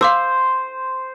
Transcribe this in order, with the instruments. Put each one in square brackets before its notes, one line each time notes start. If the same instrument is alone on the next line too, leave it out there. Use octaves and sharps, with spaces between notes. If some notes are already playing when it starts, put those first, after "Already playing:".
[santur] C5 [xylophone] F5 D6 E6